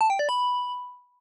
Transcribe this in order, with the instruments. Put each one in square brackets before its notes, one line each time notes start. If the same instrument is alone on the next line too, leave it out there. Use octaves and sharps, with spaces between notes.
[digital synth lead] A5
G5
D5
B5